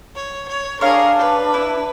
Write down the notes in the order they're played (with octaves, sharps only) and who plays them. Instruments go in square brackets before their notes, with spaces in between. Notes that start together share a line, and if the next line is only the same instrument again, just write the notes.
[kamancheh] C#5
C#5
[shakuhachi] D4 [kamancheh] G#4 A#4 [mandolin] C#5 F5
[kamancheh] B4
[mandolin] E4